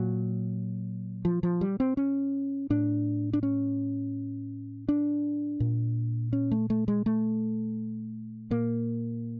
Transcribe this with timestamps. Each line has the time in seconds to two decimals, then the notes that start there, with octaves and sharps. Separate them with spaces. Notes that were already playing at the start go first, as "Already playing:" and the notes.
Already playing: A#2 F#3
1.25 F3
1.43 F3
1.61 G3
1.80 C4
1.97 C#4
2.70 A2 D4
3.33 D4
3.43 C#4
4.89 D4
5.60 A#2
6.33 C#4
6.52 A3
6.70 A3
6.88 G#3
7.06 A3
8.51 A#2 A#3